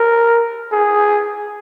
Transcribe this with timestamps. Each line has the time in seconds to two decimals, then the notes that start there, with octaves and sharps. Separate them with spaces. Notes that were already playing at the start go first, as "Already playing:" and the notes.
Already playing: A#4
0.72 G#4